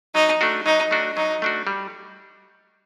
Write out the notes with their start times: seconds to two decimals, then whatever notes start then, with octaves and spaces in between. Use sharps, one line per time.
0.15 F#3 D#4
0.41 A3 D4 F#4
0.66 F#3 D#4
0.91 A3 D4 F#4
1.16 F#3 D#4
1.42 A3 D4 F#4
1.67 G3